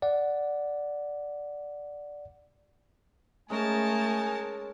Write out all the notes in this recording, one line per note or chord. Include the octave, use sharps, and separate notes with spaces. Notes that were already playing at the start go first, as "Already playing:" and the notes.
D5 F#5
G#3 A3 C#4 D#4 A#4 G#5 A5